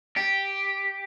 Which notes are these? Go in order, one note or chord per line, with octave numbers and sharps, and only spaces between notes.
G4